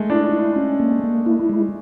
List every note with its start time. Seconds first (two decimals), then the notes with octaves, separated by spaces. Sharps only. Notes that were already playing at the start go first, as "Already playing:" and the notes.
Already playing: G#3 A3
0.10 D4 E4
0.33 E4
0.56 C#4
0.80 A#3
1.03 A#3
1.26 E4
1.49 G#3